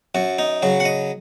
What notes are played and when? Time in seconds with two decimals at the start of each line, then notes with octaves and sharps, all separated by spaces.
0.15 F#2 F#4
0.38 D#4
0.62 C#3 F#3 F#4
0.80 F#5
0.85 D#5